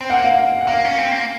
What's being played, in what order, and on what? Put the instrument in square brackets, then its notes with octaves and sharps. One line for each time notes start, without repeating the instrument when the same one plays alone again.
[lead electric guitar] C4
[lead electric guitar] A#3 [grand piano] F#5
[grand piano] F5
F5
F#5
[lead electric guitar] A#3 [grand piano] F5
[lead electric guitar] C#4
C4
A#3